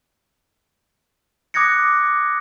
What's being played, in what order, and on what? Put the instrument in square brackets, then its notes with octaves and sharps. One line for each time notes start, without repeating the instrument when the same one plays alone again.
[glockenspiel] D6 D#6 F#6 G#6 A#6 C#7